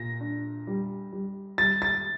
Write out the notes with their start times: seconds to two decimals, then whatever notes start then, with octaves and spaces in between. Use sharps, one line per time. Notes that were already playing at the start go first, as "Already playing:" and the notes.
Already playing: A#2 A#6
0.21 D4
0.67 G3
1.12 G3
1.58 G3 A6
1.82 A6